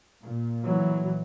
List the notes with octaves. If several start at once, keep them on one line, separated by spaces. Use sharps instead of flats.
A#2
E3 F#3